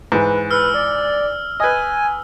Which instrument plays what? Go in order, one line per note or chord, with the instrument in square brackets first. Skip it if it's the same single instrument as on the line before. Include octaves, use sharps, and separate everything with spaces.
[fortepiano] G#2 E3 [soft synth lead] B4
[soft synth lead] B4 [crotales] E6 F6
[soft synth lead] D5
[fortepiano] B4 D#5 [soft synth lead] G#5